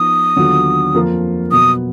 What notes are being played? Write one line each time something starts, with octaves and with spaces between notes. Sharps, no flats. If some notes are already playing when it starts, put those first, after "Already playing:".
Already playing: F3 B3 D#4 D#6
D#2 D3 F#3 B3 F4
F2 F3 A#3 F4 A#4
B2 F#3 B3 D#6